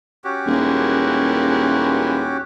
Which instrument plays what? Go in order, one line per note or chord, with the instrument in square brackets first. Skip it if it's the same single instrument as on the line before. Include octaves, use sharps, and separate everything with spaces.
[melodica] C#4 F#4 G4
[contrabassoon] D#1 [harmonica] E3 G#3 A#3